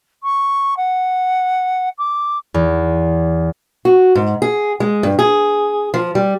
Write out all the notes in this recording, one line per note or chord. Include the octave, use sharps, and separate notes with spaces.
C#6
F#5
D6
E2
F#4
G#2
G#4
G#3
G2
G#4
F3
G3